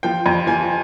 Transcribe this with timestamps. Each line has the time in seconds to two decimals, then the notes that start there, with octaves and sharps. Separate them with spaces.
0.03 F3 G5
0.26 F2
0.47 F3 G#5